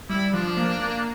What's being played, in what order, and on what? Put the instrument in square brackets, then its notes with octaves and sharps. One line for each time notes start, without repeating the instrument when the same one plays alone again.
[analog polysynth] G3 [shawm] E4
[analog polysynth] F3 [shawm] D4
[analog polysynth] A#3
A#3